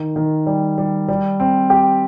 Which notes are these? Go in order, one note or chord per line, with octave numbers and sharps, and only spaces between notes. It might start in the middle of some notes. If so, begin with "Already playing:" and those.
Already playing: D#3
D#3
G3
G3
G3
C4
G4